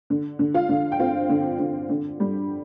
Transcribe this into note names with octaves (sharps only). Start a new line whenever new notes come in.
D3
D3
F4 F5
D3
G5
C4 F4 F5
D3
D3
D3
G3